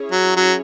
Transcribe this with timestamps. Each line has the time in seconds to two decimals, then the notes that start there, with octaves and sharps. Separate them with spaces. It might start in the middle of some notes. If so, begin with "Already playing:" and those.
Already playing: C#4 E4 G#4 C#5
0.12 F#3
0.37 F#3